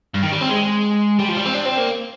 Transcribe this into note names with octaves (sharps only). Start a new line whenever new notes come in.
G2
D#3
G3
C4
G#3
G3
F3
G3
C4
D4
C4
A#3